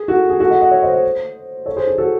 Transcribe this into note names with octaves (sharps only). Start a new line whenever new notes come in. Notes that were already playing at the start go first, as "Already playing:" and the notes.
Already playing: G#4
F#4 A4
G#4
F#4 A4
D#5 F#5
D#5 F#5
C#5 E5
C5 D#5
C5 D#5
A4 C#5
G#4 C5
G#4
F#4 A4